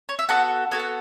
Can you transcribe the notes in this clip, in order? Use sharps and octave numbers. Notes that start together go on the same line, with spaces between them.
C#5
E5
B3 F#4 A4 F#5
B3 F#4 A4 G#5
F#5